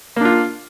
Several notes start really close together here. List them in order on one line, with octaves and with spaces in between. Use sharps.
A#3 D4 F4